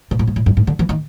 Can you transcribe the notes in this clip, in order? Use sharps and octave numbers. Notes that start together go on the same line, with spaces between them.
B2
A2
G#2
A2
G2
G#2
D3
E3
D#3